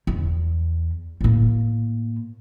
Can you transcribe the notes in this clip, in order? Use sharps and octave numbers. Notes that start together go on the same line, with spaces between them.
E2
A2 A#3